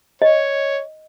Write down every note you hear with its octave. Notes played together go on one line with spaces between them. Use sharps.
C#5 D#5